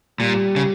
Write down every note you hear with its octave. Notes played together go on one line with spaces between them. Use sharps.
A#2 G3
C#3